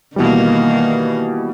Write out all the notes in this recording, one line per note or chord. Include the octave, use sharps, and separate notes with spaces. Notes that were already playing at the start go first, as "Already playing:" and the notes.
B2 D#3 E3 G3 A#3